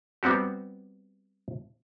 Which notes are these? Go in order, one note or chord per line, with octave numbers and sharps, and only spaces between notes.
G3 B3 C4 F#4 G4